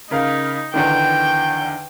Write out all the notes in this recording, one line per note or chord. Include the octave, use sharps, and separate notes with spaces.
C#3 D#4 A#4 F5
E2 D3 D#3 G5